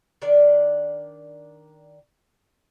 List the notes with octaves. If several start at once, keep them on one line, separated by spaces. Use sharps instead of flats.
D#3 D4 D5